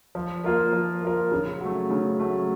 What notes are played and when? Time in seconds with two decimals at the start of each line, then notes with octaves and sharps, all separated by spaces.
0.15 F3
0.44 A#3 F4 A#4
0.73 F3
1.02 A#3 F4 A#4
1.32 C#3
1.61 F#3 A3
1.90 C#3
2.20 F#3 A3